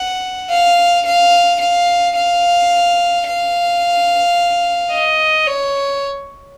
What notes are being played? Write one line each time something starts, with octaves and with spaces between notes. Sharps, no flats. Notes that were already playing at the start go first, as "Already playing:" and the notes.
Already playing: F#5
F5
F5
F5
F5
F5
D#5
C#5